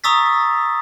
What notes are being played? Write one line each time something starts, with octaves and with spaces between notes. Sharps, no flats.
A#5 C#6 D#6 E6 A6 B6